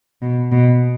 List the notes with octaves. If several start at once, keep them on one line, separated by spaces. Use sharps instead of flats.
B2
B2